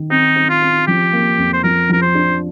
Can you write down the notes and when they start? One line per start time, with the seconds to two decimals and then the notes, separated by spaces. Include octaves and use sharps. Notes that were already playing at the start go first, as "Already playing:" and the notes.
Already playing: D#3
0.10 C4 D#4
0.36 C4
0.49 F4
0.62 C4
0.87 F3 G4
1.13 A#3
1.38 F2
1.53 C5
1.63 F3 A#4
1.89 F3 A#4
2.02 C5
2.15 D4